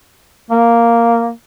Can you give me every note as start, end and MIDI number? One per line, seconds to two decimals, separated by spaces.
0.51 1.30 58